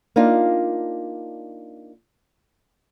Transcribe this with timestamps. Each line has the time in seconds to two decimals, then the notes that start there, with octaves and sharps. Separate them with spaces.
0.16 A#3 D4 D#4 F4